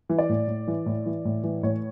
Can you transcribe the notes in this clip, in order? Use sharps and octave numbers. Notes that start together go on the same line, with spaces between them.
E3
D5
A2
A2
E3
A2
E3
A2
E3
A2 C#5